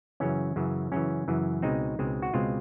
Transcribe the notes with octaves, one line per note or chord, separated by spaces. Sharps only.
F#2 C#3 E3 C#4
F#2 C#3 E3
F#2 C#3 E3 C#4
F#2 C#3 E3
C#2 B2 G#3 C4 D#4
C#2 B2 G#3 C4
F#4
C#2 B2 G#3 C4 F4